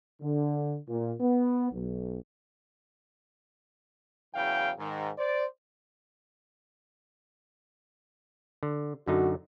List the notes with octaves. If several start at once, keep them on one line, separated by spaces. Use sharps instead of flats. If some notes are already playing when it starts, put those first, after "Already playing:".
D3
A#2
B3
B1
E2 C#3 E3 F#3 F5 G5
G#2 D#3
C5 D5
D3
F#2 D3 D#4 F#4